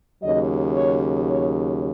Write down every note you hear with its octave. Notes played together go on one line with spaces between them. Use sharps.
D#2 C#3 F#3 D#5
C#5
C#5